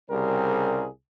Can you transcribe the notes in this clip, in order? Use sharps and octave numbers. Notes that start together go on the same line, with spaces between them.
C2 C#3 G3 C4 G#4 A#4